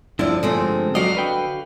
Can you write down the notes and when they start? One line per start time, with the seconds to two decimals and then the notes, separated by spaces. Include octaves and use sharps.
0.19 G2 D3 F3 E4 D5
0.43 G#3 A3 C4
0.95 F#3 F#4 D5 D#5 F5
1.15 D3 B4 G5